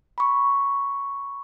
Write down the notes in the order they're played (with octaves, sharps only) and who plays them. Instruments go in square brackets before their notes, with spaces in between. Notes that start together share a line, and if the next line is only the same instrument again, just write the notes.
[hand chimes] B5 C#6